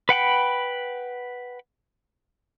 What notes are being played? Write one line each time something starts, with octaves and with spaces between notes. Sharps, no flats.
B4 F#5 G5 B5